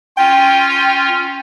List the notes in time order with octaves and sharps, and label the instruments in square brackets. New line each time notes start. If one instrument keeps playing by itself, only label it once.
[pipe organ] C#4 F4 [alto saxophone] G5